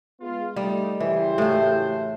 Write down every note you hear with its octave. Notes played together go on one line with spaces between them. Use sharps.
G#3 B3 F4
G3 A3 D#4
F#1 E3 G4 C5
A2 A3